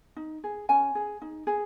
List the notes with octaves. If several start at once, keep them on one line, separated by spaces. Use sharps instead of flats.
D#4
G#4
C#4 G#5
G#4
D#4
G#4